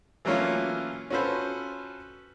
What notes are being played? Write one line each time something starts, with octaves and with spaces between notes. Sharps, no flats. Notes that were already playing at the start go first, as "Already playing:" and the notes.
E3 F#3 A3 A#3 C#4 F4
C#4 F4 F#4 A4 B4 C5